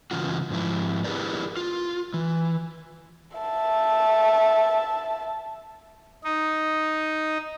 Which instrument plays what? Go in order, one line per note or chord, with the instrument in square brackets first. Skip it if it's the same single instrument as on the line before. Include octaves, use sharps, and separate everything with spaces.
[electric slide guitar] G2 C#3 E3 F4 F#4
G#2 F3 E4
E4 G4 G#4 A#4 B4 D5
F4
E3
[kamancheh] E5 A5
[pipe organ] D#4